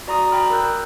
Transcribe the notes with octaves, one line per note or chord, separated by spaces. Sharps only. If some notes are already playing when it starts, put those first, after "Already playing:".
F#4 D5 A#5 C6 D#6
D5 G5 A#5 B5 D#6 F6
A#4 E6 F#6 G6